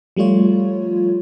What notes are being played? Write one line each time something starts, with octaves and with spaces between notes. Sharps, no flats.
F3 G3 A3 F4 C#5